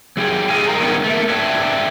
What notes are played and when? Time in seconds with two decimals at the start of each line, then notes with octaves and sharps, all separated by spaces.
0.17 F#3 G4 G#4
0.49 G#4 A4 D#5 F5 G#5
0.68 G#4 A#4 F5 G5 A#5
0.79 D#3 F#3 G3 A3 B3 C#4
1.03 A3 A#3
1.29 B4 C#5 D5 E5 G5 A5